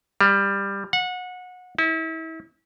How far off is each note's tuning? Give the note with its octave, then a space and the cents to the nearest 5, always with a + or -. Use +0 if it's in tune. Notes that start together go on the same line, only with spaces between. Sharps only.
G3 +15
F#5 -25
E4 -35